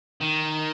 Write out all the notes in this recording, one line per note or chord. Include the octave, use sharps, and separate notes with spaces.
D#3